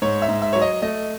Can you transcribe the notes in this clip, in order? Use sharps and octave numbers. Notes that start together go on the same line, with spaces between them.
G#2 C#5
E5
G#2
E5
F#3 C#5
D#5
A3 D#5